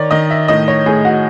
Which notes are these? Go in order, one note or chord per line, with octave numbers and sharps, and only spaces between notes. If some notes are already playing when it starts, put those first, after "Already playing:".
Already playing: D#3 C#5 D5
D#3 D#5
E5
A2 D#5
C#5
A2 G#4
F#4